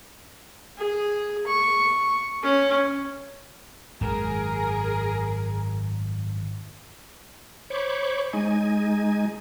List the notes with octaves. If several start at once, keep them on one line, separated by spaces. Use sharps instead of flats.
G#4
C#6
C#4
G#1 F#2 G#4 A#4
C5 C#5 B5 C#6 D6
G#3 D#4 G#5